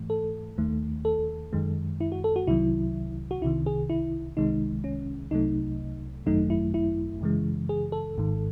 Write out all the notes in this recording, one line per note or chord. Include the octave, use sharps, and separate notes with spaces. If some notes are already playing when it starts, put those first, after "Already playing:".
Already playing: G#2 E3 A3
A4
D#2 D#3 A3
A4
F#2 D#3 G#3
E4
F#4
A4
F#4
C2 C3 D#3 F#3 E4
F#4
C2 C3 D#3 E4
G#4
E4
C2 C3 D#3 G#3 D#4
C#4
C2 C3 F#3 A3 D#4
G#1 F#2 D#3 F#3 A3 D#4
E4
E4
F#2 C#3 E3 G#3
G#4
A4
G#1 G#2 D#3